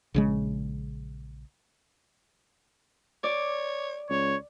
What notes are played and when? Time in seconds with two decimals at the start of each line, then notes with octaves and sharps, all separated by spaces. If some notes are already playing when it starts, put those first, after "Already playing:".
0.14 A#1 C#3 G#3
3.24 C#5 D5
4.10 C#2 C#5